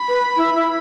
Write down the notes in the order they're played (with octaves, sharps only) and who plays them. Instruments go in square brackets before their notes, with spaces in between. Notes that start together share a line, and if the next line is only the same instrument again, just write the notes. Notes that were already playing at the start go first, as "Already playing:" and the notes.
Already playing: [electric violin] B5
[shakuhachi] B4
E4
E4